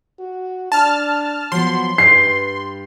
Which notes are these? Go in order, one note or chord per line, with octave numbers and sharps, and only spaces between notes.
F#4
D4 A5 F6
F3 F#3 B3 F#4 C6
G2 G3 B4 C7